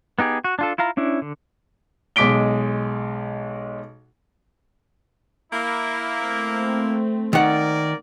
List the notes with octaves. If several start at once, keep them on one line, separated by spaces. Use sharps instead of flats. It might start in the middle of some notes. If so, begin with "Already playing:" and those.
B3 D#4 G4 G#4
F#4
D4 F4 A4
E4 F4 F5 A#5
C#4 D4 E4
D3
B1 G#3 D6 B6 D7 G7
A#3 E4
A3 C4
D#3 A#3 A#4 D5 F#5